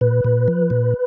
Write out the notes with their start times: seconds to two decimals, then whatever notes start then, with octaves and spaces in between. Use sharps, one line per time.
0.01 A#2 B4
0.24 A#2
0.48 F3
0.70 A#2